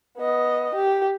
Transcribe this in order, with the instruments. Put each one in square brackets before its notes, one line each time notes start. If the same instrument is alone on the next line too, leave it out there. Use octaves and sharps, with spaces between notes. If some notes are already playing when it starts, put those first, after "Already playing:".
[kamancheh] B3 D#5
G4